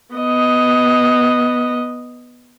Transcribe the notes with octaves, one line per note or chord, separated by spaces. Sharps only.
B3 D#5